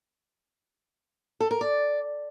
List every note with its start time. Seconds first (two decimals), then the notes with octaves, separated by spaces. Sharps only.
1.40 A4
1.51 A#4
1.61 D5